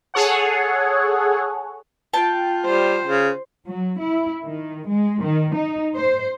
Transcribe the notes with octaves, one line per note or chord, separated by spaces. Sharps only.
G#4 A4 C#5 F#5
F4 G5 A5
G3 C5
C#3
F#3
E4
D#3
G#3
D#3
D#4
C5